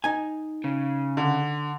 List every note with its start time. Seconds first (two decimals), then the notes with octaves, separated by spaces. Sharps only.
0.04 D#4 G#5
0.64 C#3
1.17 D3